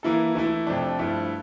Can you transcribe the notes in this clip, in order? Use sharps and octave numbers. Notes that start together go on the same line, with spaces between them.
E3 A#3 E4 A4
E3 A3 E4
F2 C3 F3 A3 D4
G2 F3 A3 E4